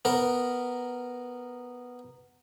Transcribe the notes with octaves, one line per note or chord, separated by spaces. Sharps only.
B3 A#4